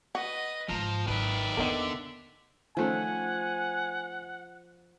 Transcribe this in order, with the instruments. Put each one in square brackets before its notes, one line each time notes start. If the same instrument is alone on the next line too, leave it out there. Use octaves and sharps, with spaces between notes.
[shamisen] F#4 [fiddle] B4 D#5
[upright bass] G#2 D#3 [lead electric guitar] F3 [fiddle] A#5
[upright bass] G#1 F#3 [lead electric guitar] D#3 B4 [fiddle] D5 E5
[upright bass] E2 A#3 [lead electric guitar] D3 [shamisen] D#3 B3 A#4
[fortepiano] D#3 A3 C#4 [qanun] F3 [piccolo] F#5 [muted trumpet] G#5